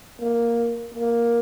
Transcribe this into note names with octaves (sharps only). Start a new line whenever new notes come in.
A#3
A#3